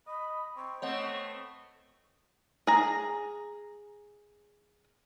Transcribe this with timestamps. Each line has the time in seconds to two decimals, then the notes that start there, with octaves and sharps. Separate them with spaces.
0.07 D#5 B5
0.56 C4 C#6
0.82 A3 B3 C4 C#5 D#5 F#5
2.67 G#4 A#5